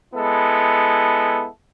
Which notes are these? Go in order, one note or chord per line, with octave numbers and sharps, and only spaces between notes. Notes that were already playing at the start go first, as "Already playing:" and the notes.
G#3 B3 E4 A4